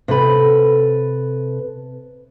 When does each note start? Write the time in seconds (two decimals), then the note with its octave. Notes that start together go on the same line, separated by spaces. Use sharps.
0.08 C3 A4 B4